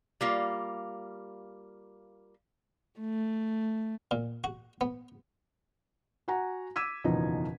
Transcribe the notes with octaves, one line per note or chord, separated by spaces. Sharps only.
G3 A#3 F4
A3
A#2
F#4
B3
F#4 F#5 G#5 A#5
D6 E6 G#6 B6 D#7
F#1 E2 B2 F3 D#4